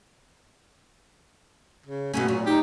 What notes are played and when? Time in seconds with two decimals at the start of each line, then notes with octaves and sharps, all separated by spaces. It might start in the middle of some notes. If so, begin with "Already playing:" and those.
1.86 C#3
2.14 B2 A3 A#3 C#4
2.28 A#2 F#3
2.46 D#4 G4